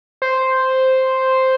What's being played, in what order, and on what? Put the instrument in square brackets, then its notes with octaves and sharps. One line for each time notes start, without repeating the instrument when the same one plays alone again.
[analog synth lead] C5